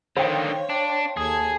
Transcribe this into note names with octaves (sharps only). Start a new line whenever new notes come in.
D3 D#3 C5 C#5 F5 G5
D4
D#2 G#4 A4 G#6